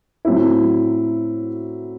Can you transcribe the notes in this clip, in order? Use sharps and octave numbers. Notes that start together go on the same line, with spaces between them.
A2 F#3 C4 E4